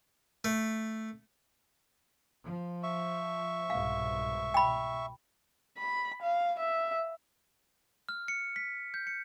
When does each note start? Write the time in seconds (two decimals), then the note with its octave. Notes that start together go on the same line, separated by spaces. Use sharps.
0.44 A3
2.44 F3
2.83 E5 C#6
3.70 C2 G#2 B2 F5
4.54 B2 G5 B5
5.78 B5
6.22 F5
6.60 E5
8.09 F6
8.28 C#7
8.56 B6
8.94 G6
9.07 C#7